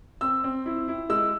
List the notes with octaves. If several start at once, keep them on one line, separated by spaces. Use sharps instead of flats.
C4 E6
C4
E4
E4
G#3 E6